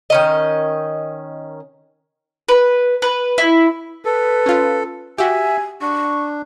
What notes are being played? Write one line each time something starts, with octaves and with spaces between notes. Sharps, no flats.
D#3 C#4 D#5
B4
B4
E4
A4 B4
C#4 F4
F#4 G4 E5 G#5
D4 C#6